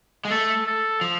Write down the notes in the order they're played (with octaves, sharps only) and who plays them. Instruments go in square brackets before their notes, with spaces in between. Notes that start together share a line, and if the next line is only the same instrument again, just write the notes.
[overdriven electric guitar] G#3
[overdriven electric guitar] A3 [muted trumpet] A4
[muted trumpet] A4
[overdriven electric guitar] F3